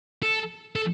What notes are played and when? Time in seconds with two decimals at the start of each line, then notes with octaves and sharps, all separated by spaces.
0.23 A4
0.76 A4